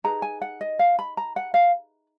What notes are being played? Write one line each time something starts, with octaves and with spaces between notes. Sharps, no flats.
D#4 G#4 B4 A#5
G#5
F#5
D#5
F5
B5
A#5
F#5
F5